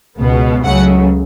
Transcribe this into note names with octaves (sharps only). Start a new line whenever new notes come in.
C#2 B2 B3
C#2 C#3 F#3 A3 F#5